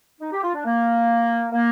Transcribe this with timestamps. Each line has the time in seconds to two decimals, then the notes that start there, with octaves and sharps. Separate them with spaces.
0.21 D#4
0.32 G4
0.44 F4
0.54 D4
0.65 A#3
1.53 A#3